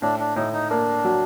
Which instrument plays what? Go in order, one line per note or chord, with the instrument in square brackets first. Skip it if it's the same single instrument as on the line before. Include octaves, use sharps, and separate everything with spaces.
[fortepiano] A2 [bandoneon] D4
[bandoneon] D4
[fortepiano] A2 [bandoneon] D#4
[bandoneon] D#4
[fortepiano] A#3 [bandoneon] D4
[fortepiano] F#3